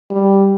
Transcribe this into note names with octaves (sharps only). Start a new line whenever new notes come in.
G3